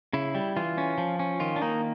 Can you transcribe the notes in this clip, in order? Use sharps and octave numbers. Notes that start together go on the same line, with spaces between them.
C#3 E4
G3
E3 F4
C#4
F3
C#4
D#3 F4
D4
A#3 D#4